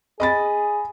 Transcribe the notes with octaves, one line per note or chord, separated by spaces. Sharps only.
G#4 D#5 B5 A6